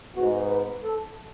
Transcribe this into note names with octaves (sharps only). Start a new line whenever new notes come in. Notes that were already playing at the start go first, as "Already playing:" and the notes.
G#2 G#3 B3 F#4
B4
A4